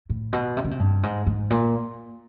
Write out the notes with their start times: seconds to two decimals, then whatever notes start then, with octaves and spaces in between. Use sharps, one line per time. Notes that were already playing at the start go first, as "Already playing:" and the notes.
0.10 A2
0.33 B2
0.57 C3
0.64 C#3
0.71 C3
0.79 G2
1.03 G#2
1.26 G#2
1.50 A#2